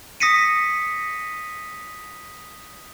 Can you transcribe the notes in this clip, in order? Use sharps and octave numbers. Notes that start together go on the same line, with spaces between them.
D#6 A#6 B6 C#7 D#7